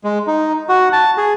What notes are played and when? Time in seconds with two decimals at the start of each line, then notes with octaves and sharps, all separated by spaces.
0.04 G#3
0.27 D#4
0.69 F#4
0.93 A5
1.18 G#4